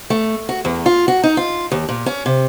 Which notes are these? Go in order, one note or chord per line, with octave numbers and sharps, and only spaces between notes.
A3
F#4
E2
F4
F#4
D#4
F4
D#2
A#2
C#4
C3